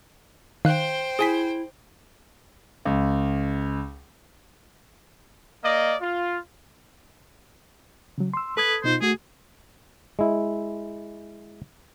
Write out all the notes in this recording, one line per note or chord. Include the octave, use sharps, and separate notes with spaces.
D#3 C5 F5 G5 F#6
E4 G#4 G#5 B6
C#2
A#3 D5 D#5
F4
C#3 F#3
C6 E6
A4 B4 D#6 G#6
B2 D#4 F4 C5
A3 F#4 G#4
G#3 E4